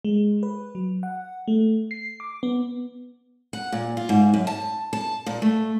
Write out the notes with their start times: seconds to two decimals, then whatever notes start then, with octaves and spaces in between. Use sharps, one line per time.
0.05 G#3
0.43 B4
0.75 F#3
1.03 F#5
1.48 A3
1.91 C7
2.20 D6
2.43 B3
3.53 F#5
3.72 A#2
3.97 F4
4.09 G#2
4.34 F#2
4.47 A5
4.93 A5
5.26 A#2
5.42 A3